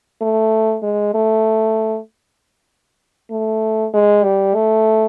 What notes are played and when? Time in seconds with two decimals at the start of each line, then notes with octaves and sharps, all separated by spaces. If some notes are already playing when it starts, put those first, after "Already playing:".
0.22 A3
0.83 G#3
1.14 A3
3.31 A3
3.94 G#3
4.24 G3
4.55 A3